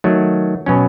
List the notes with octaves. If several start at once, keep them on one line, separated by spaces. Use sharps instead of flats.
D#3 F#3 A3
B2 F#3 C#4